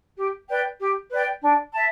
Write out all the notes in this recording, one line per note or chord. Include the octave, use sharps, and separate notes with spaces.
G4
B4 D5 G5
G4
B4 D5 G5
D4
E5 A5